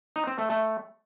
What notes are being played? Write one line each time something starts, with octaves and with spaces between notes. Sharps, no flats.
D#4
C4
A3
A3